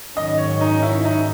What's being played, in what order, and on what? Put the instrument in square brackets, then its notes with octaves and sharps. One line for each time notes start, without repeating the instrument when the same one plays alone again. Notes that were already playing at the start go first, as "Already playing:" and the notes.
[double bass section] G#2 D#3 F#3 C#4 [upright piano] D#5
[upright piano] C#5
D#4
E4
D#4